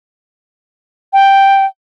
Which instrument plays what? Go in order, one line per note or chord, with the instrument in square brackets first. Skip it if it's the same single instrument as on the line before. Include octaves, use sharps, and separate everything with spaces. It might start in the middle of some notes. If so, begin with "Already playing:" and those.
[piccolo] G5